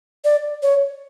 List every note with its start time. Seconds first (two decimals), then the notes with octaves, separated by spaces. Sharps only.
0.24 D5
0.63 C#5